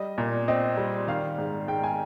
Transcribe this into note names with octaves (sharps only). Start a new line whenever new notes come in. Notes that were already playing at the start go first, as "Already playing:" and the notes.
Already playing: G3 D#5
A#2
C4 D#5
G3
D#3 F5
G#2
G#2 G5
G#5